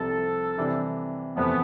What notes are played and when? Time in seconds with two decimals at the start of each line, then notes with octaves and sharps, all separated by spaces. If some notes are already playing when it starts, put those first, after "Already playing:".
Already playing: C2 C3 F3 A4
0.58 C3 E3 G3 D4
1.36 E2 C3 F3 A3 B3